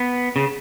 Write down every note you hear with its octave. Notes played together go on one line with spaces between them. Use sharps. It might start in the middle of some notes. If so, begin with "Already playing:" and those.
Already playing: B3
C#3